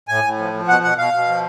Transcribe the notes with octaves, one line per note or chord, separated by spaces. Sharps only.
A2 G#5
A2
F3
F3
B2 F#5
B2 F#5
B2 F5
B2
F3